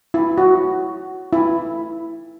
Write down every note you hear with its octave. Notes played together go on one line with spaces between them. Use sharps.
E4
F#4
E4